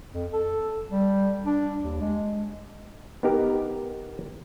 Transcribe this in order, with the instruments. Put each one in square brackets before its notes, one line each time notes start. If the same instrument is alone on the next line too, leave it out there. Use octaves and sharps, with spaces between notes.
[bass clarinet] F2
A4
G3
D4
D#2
G#3
[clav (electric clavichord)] B3 D#4 G4 A#4